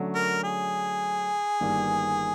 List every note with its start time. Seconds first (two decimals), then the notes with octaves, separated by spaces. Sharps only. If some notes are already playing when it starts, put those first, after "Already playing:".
Already playing: D3 F#3 A3 C#4
0.15 A#4
0.44 G#4
1.61 G1 G2 D#3 G3 A#3